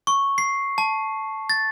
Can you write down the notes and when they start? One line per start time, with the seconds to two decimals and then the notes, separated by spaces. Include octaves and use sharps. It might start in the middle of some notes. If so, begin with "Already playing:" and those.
0.07 C#6
0.38 C7
0.78 A5
1.50 A6